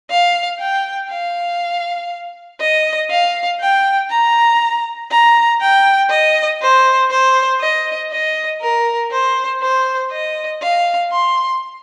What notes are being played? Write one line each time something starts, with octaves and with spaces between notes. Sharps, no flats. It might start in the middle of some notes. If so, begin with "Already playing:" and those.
F5
G5
F5
D#5
F5
G5
A#5
A#5
G5
D#5
C5
C5
D#5
D#5
A#4
C5
C5
D#5
F5
C6